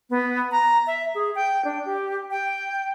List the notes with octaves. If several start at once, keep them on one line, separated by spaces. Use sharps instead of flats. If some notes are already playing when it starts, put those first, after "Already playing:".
B3
A#5
E5
G#4
G5
D4
G4
G5